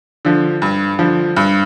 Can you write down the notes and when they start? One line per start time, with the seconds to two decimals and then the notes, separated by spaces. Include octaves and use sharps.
0.25 D3 F3
0.62 G2
0.99 D3 F3
1.37 G2